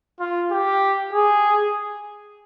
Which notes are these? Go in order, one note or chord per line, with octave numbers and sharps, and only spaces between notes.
F4
G4
G#4